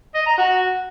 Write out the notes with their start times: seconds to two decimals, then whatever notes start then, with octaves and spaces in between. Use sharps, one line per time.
0.15 D#5
0.26 A#5
0.38 F#4